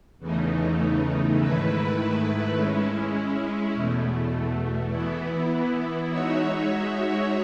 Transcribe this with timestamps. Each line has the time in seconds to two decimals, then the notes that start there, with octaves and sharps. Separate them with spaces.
0.19 E2 C#3 E3 A3 D#4
1.37 G#2 D#3 A3 E4 B4
2.54 G#3 C#4 E4
3.73 E2 B2 A3
4.91 E3 B3 E4
6.09 G#3 D#4 F#4 C#5 E5